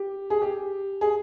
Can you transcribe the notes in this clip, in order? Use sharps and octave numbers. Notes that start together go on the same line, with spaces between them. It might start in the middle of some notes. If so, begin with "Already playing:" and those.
Already playing: G4
G#4
G4
G#4